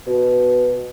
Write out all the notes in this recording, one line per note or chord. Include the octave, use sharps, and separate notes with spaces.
B2